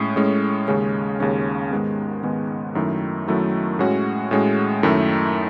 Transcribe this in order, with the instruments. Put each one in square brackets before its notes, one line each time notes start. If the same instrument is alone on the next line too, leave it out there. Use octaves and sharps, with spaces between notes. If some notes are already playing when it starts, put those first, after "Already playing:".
Already playing: [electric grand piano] A2 G#3 C#4
A2 G#3 C#4
D#2 C#3 G#3 C#4
D#2 C#3 G#3 C#4
G#2 D#3 G#3 B3
G#2 D#3 G#3 B3
F#2 D#3 F#3 A3 E4
F#2 D#3 F#3 A3 E4
A2 G#3 C#4 F#4
A2 G#3 C#4 F#4
F#2 D#3 A3 E4